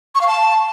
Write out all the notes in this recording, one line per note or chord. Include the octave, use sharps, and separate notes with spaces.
C#6
F5
A5